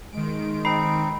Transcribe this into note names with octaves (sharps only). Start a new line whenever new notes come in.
D#3 G#3 D7
C4 D#4 B5 C7